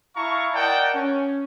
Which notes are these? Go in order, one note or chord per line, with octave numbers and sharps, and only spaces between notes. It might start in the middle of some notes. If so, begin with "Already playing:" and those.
E4 F5 A5 A#5 C#6
A#4 D5 D#5 F#5 G5 A5
C#4